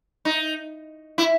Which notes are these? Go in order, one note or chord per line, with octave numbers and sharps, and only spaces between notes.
D#4
E4